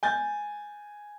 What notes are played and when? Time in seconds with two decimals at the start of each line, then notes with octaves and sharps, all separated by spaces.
0.03 G#5 G6 A6